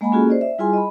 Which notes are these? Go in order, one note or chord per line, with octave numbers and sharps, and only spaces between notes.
G#3 A#3 D#5 F#5 G#5 B5
A#3 C#4 F4 F#4 G#4 A4
C5 D5 D#5
E5
G3 E4 F4 G#4 G#5 C6
D#5 B5